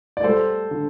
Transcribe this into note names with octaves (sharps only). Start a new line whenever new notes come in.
D5
G3 A4 C5
D3